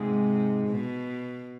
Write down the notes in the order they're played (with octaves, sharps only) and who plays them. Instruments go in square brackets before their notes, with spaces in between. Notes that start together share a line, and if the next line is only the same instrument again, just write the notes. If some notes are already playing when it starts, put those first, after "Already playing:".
Already playing: [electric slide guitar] G#2 G#3 [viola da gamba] C3
[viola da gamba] B2